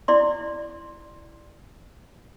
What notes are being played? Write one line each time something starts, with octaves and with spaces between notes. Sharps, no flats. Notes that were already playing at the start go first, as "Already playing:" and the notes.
E4 D5 C6